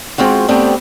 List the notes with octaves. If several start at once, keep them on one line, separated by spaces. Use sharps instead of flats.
G#3 C4 F4 F#4
G3 A3 B3 C4 D4